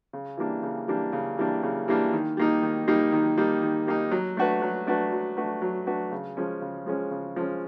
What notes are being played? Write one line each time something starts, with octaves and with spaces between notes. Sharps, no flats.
C#3
E3 G3 A#3 D4
C#3
E3 G3 A#3 D4
C#3
E3 G3 A#3 D4
C#3
E3 G3 A#3 D4
D#3
G3 A#3 D#4
D#3
G3 A#3 D#4
D#3
G3 A#3 D#4
D#3
G3 A#3 D#4
F#3
A3 D4 F#4 B4
F#3
A3 D4 F#4 B4
F#3
A3 D4 F#4 B4
F#3
A3 D4 F#4 B4
C#3
F3 G#3 C#4
C#3
F3 G#3 C#4
C#3
F3 G#3 C#4